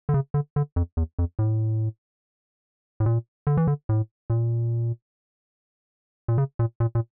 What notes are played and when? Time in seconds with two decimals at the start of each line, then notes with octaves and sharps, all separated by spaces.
0.09 D3
0.14 C#3
0.34 D3
0.56 D3
0.76 F2
0.97 E2
1.19 F2
1.39 A2
3.00 A2
3.06 A#2
3.47 D3
3.57 E3
3.67 D3
3.89 A2
4.30 A#2
6.28 A#2
6.38 C#3
6.59 A#2
6.80 A#2
6.95 A#2